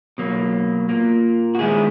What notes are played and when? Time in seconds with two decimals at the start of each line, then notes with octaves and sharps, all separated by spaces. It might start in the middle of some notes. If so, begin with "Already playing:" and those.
0.18 B2 F#3 A#3
0.89 A#2 A#3
1.55 F#4
1.59 D#3 G#3 B3 E4 G#4